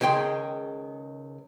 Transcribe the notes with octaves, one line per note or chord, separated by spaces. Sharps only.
C#2 D#3 G#3 G5 C6